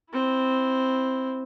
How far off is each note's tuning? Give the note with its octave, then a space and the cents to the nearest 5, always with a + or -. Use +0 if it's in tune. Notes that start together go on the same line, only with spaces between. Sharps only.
C4 +0 E4 +0